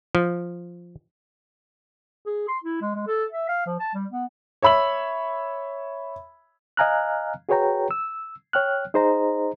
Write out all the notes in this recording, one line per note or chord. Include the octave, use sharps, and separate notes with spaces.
F3
G#4
C6
E4
G#3
G#3
A4
E5
F5
F3
A5
G3
B3
C#5 E5 B5 E6 F#7
D#5 F5 G#5 A#5 F6 F#6
F#4 G#4 B4 C#5 G5 A#5
E6
C#5 G5 F6 F#6
D#4 G#4 C5 D#5 A#5